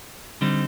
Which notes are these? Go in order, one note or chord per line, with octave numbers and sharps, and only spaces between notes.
D3 G3 C4 D#4